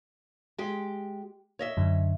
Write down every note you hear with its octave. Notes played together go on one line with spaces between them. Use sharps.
G#3 G4
C#5 D#5 E5
F#2 D3